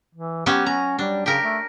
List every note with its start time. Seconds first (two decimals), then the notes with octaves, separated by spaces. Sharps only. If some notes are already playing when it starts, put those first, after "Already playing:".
0.15 E3
0.46 F#3 B3 C#4 G4
0.66 C#4 A#5
0.99 G3 D4
1.26 C#3 G4 A#4
1.43 A3